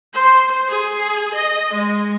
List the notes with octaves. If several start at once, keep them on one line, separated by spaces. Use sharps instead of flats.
C5
G#4
D#5
G#3